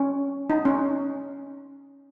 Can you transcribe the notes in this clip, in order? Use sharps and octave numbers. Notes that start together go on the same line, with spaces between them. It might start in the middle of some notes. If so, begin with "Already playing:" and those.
Already playing: C#4
D#4
C#4